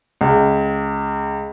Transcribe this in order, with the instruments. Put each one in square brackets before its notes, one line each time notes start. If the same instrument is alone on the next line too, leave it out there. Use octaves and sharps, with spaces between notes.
[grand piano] C#2